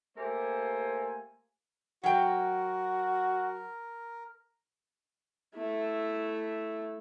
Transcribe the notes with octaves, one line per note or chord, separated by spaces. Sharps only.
A3 A#3 G4 A#4 C5 G#5
F#3 F#4 A#4 G5
A3 E4